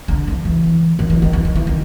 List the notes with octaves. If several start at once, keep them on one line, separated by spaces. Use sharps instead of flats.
D3
E3
E3
D#3
E3
D#3
E3
D#3
E3
D#3